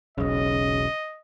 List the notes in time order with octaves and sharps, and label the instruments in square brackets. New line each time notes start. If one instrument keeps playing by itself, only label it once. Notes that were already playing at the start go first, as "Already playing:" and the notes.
[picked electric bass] E1 B1 [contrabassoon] C#3 [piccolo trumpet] D#5